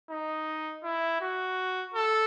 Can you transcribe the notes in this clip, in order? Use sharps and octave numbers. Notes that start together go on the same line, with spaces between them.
D#4
E4
F#4
A4